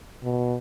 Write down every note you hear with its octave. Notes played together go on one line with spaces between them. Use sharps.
B2